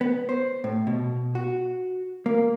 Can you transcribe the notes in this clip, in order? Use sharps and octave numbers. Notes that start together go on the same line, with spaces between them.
B3
C5
A2
B2
F#4
A#3